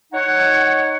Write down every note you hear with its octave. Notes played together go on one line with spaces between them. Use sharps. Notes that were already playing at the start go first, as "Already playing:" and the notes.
D#4 C#5 F#5